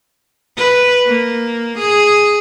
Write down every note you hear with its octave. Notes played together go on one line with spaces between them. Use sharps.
B4
A#3
G#4